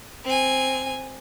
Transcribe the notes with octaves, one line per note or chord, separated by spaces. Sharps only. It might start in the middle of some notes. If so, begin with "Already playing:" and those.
C4 G#5